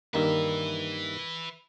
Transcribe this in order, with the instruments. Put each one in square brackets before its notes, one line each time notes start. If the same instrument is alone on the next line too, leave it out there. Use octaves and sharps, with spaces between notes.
[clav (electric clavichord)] G2 D#3 A#3 [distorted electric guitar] B4 E5